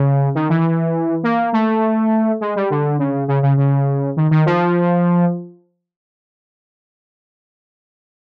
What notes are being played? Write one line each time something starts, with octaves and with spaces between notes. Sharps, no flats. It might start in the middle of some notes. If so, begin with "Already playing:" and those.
Already playing: C#3
D#3
E3
A#3
A3
G#3
G3
D3
C#3
C#3
C#3
C#3
D#3
D#3
F3